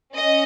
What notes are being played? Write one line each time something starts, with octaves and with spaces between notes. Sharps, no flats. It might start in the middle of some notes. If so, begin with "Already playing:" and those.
C#4 D#5